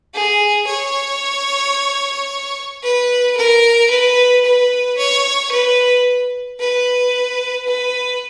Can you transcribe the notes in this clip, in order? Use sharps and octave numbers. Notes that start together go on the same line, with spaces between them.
G#4
C#5
B4
A#4
B4
B4
C#5
B4
B4
B4